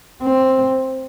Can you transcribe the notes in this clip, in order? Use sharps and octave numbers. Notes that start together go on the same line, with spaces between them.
C4